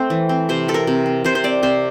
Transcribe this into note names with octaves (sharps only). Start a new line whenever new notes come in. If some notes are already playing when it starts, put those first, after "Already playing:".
Already playing: A3 C4 C5
E3
C4
C3 C5
C4 A4
A#4
C3
C4
C3 C5
C5
C4 D5
C3 C5